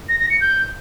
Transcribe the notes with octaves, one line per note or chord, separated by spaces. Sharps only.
A#6
A#6
C#7
G6